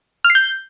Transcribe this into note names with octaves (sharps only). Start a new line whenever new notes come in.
F6
C7
G6